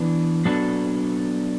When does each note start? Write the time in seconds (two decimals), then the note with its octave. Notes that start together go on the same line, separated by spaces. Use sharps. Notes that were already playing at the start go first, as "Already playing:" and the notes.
Already playing: E3 B3 D4
0.45 F#3 B3 D4 A4